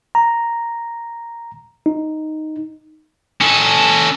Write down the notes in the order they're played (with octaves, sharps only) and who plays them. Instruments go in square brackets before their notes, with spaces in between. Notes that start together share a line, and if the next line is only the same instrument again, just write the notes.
[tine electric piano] A#5
D#4
[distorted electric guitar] C#4 A4